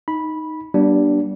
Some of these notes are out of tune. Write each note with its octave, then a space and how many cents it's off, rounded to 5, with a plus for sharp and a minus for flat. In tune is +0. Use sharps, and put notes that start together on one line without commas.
D#4 +0 B5 -10
G3 -25 B3 -45 D4 +0